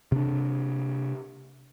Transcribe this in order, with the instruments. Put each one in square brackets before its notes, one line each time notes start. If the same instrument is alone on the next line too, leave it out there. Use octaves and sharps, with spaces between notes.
[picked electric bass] C3 D4